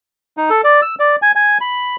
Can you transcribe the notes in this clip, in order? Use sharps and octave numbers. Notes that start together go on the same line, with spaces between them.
D#4
A4
D5
E6
D5
G#5
G#5
B5